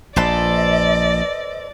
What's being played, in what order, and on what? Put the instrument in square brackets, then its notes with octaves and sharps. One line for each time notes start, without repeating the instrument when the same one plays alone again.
[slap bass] A#1 [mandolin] A4 B4 C5 [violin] D5 [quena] D#5